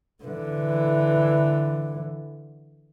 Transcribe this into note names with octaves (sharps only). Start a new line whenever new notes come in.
D3 E3